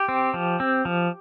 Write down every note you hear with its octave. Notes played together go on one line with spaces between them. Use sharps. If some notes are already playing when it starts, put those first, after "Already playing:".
Already playing: G4
C4
F3
C4
F3